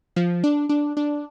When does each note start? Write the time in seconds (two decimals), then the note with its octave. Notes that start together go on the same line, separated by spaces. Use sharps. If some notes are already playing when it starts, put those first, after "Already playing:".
0.16 F3
0.44 D4
0.69 D4
0.97 D4